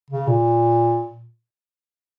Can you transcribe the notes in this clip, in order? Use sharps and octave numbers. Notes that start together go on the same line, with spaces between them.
C#3
A#2